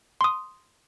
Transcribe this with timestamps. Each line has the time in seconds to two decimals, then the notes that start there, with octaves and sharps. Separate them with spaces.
0.21 C6 D#6